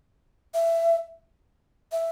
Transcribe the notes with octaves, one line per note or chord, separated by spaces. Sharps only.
E5
E5